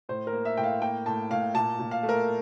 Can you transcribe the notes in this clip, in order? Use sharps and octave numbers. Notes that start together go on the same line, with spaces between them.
A2 C5
A#4
A#3
E5
A2 G5
F5
A#3 G5
A2 A5
A2 F5
A#2 A5
A#2
F5
A3
A#4